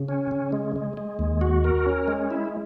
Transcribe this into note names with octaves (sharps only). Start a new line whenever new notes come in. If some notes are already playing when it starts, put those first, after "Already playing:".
Already playing: C#3
C#4
C#3
G#3
G#3
G#3
D#2
F#4
A#4
C#4
G#3
E4